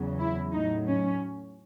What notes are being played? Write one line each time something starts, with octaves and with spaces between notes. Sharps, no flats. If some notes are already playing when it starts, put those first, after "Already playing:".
Already playing: E2 C#3 F#3
E4
A2 F#3 D#4
C#4